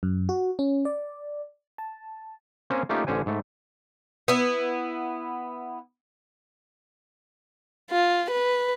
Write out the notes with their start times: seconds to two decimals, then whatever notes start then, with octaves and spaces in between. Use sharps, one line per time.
0.03 F#2
0.29 F#4
0.59 C#4
0.85 D5
1.78 A5
2.70 A#3 C4 C#4 C5 G#5
2.89 A3 A#3 C#4 D#4 F4 G4
3.07 A1 D3 C#4 C5 G#5
3.26 G#2 A3
4.28 B3 E4
7.91 F4
8.31 B4